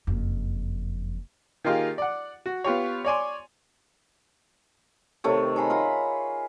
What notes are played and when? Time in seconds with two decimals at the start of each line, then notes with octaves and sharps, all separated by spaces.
0.07 F#1 F2
1.64 D#3 A#3 D#4 F4 G4 G#4
1.98 D5 F#5
2.46 F#4
2.64 B3 F4 G4 C#5
3.05 C#5 D5 G#5 C6
5.24 C3 D#3 A3 C#5
5.56 D#4 G#4 A#5 B5
5.70 F4 E5 A#5 B5